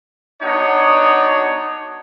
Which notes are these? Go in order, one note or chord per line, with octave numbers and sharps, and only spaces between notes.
B3 D4 D#4 F#4 C#5